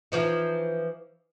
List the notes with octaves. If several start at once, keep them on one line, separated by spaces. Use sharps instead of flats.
E3 F3 D#4